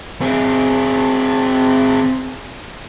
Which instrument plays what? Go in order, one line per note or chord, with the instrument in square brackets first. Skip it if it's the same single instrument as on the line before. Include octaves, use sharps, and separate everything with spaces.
[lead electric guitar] C4 G#4